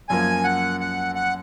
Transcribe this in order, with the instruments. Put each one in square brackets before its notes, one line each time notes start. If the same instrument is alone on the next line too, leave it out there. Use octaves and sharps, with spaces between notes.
[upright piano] F#2 F3 A#3 [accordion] G#5
[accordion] F#5
F#5
F#5